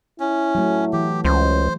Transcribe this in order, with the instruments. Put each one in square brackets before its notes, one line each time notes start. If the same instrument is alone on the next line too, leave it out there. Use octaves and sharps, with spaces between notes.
[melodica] C#4 [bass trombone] E4
[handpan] F#3 A3
[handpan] E3 [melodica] G4
[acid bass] C#2 [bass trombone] C#4 [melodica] C5